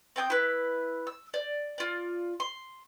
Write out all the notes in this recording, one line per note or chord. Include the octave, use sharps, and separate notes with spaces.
C4 G5 G#5 D#6
E4 B4
E6
D5
F4 D5
C6